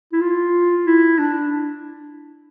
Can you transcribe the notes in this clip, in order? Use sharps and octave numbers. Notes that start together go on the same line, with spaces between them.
E4
F4
E4
D4